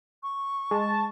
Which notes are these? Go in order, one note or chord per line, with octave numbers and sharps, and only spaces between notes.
C#6
G#3 A5